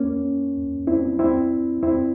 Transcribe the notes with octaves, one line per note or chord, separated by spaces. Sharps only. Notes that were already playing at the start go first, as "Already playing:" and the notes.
Already playing: A#3 C#4
C4 E4
C4 E4
C4 E4